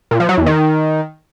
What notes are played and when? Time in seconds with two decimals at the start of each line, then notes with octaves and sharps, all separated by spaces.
0.11 A#2
0.20 F3
0.29 F#3
0.38 E2
0.46 D#3